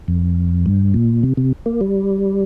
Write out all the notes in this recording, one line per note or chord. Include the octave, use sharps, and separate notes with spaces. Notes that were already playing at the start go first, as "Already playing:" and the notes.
F2
G2
A#2
C3
C3
A#3
G3